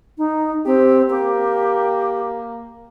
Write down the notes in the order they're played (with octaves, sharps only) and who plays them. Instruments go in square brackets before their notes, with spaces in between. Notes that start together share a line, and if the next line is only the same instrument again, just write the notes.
[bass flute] D#4
[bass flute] C4 [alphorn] G4
[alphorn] A#3 [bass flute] G4